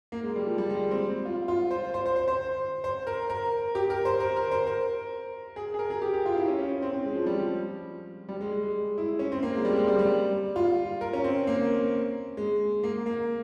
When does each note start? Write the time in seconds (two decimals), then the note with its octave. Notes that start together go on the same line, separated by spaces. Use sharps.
0.12 A#3
0.23 G#3
0.36 G3
0.46 F3
0.58 G3
0.70 G#3
0.91 C4
1.25 F4
1.48 F4
1.71 C5
1.94 C5
2.06 C5
2.16 C5
2.28 C5
2.84 C5
3.07 A#4
3.30 A#4
3.75 G4
3.90 A#4
4.05 C5
4.20 A#4
4.36 A#4
4.51 C5
4.67 A#4
5.56 G#4
5.74 G#4
5.79 A#4
5.90 G#4
6.02 G4
6.14 G4
6.26 F4
6.37 E4
6.48 C#4
6.59 C#4
6.82 C4
6.93 C4
7.04 G#3
7.15 F3
7.26 G3
7.38 F3
8.29 G3
8.41 G#3
8.52 G#3
8.63 G#3
8.98 E4
9.19 C#4
9.32 C4
9.43 A#3
9.54 G#3
9.65 G3
9.76 G#3
9.88 G3
9.99 G3
10.56 F4
11.01 A#4
11.13 C#4
11.24 C4
11.47 A#3
12.37 G#3
12.83 A#3
13.06 A#3